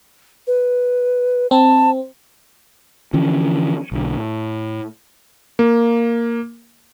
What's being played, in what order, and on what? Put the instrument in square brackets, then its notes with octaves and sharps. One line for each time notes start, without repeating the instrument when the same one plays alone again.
[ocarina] B4
[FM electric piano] C4 [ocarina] A5
[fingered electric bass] D3 E3 F3 C#4
B1 D3
A2
[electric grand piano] A#3